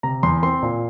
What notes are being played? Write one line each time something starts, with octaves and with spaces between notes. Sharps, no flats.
C3 A#5
E2 C6
C4 C6
A#2